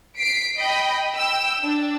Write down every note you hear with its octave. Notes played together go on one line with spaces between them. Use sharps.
B6 C7 D7
D#5 G5 B5
G5 E6
D4